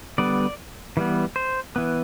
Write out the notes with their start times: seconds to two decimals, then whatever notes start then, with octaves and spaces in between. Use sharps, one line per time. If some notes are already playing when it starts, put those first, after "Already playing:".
0.18 D3 G3 B3 D5
0.97 E3 G3 B3
1.36 C5
1.76 E3 B3